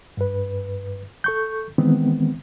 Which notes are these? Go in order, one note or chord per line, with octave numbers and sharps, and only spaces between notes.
G2 B4
A4 C#6 G6
D#3 E3 G#3 B3 C4